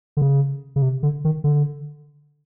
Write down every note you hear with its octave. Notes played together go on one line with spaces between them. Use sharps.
D3
C#3
C#3
C3
D3
D#3
D3